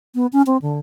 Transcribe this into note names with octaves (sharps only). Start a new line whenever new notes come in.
B3
C#4
C4
D3